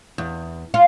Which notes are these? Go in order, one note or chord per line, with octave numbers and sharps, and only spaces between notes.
E2
F4